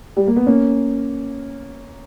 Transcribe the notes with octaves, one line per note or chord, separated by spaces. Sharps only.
G3
A#3
B3
A#3 C#4